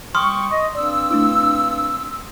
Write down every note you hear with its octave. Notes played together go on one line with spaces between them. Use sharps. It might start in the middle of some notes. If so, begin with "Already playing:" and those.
G3 G5 C6 C#6 D#6 F6
D#5 C#6
G2 C4 D5 E6
A3 D4 E4